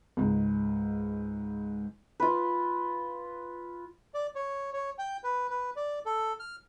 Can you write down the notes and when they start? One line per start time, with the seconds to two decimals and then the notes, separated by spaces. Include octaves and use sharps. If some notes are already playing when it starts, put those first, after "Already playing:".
0.17 C#2 G#2
2.20 F4 B4
4.14 D5
4.35 C#5
4.73 C#5
4.99 G5
5.24 B4
5.50 B4
5.76 D5
6.06 A4
6.40 F6